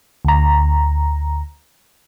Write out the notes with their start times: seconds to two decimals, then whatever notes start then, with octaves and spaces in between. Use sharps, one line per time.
0.25 D2 A#5